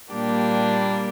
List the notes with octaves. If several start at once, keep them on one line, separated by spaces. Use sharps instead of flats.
A#2 G3 A#3 D4 G4